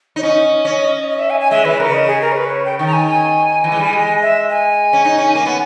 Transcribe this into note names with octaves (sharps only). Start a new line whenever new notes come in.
D#4 C#5
C#4 D#5
C#4
D#5
E5
G#5
G#5
G#3 E5
E3 B4
C#3 A#4
D#5
G#4
A#4
C#5
B4
C#5
G5
D#3 G5
A#5
G#5
G#5
E3
G#3
G3
G#3
E5
G#5
C#4
D#4
C#4
A#3
B3